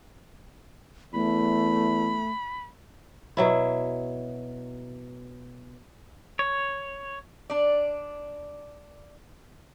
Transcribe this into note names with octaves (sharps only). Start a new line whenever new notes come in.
E2 A3 B5
B2 F#3 E4
C#5
D4 D5